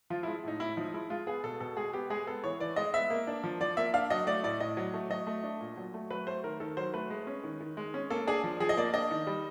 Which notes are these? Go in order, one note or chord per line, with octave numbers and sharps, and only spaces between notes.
F3 F4
E4
G#3
A2 D#4
A2 E4
F3 D#4
G#3 E4
G#3 F4
B3 G#4
B2 A4
B2 A4
G#3 G#4
B3 G4
G#3 G#4
B3 A4
E3 C#5
E3 D5
G#3 D#5
B3 E5
A#3
D4
F3
F3 D5
A#3 E5
D4 F5
F#3 D#5
A3 D5
A2 D5
A2 D#5
F#3
A3
F#3 D#5
A3
D4
A#2
F#3
A3
F#3 B4
A3 C5
D#3 A#4
D#3 A4
F#3 C5
A3 B4
G#3
C#4
D#3
D#3
G#3
C#4
A#3 A4
D4 G#4
F3
F3 G#4
D#5
A#3 D5
D4 D#5
D#3
G3